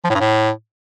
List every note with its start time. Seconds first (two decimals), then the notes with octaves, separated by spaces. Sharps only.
0.04 F3
0.10 A2
0.15 G2
0.20 A2